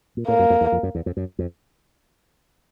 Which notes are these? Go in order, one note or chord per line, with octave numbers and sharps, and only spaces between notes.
A#2
A2 A#3
F#2
F2
E2
F2
F#2
E2
F2
F#2
F2